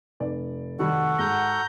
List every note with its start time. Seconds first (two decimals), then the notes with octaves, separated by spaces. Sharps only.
0.20 F1 D5
0.79 D#3 G3 F#4 A4 F#5
1.19 G#2 A#5 G6